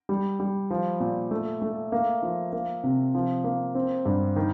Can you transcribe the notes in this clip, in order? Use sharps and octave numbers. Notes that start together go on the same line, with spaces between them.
G3
G3
F3
A#2
A3
A3
A#3
F3
A#3
C3
F3
A#3
C4
G2
D#3